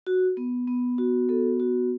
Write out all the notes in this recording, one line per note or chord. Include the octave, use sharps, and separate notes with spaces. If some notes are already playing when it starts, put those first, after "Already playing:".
F#4
B3
B3
F#4
B3 A4
F#4